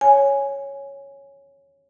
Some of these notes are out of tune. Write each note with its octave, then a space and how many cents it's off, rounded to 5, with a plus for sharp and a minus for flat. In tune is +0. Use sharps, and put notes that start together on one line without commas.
C#5 +0 G#5 +0